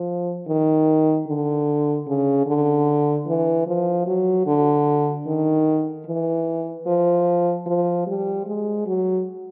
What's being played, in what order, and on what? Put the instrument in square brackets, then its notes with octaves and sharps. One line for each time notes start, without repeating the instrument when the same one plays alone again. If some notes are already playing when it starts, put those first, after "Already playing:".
Already playing: [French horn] F3
D#3
D3
C#3
D3
E3
F3
F#3
D3
D#3
E3
F3
F3
G3
G#3
F#3